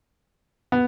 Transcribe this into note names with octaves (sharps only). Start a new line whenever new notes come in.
B3